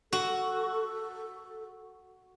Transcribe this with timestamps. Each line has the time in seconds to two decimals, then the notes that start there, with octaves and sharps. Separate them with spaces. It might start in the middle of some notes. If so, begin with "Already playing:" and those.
0.13 F#4 A4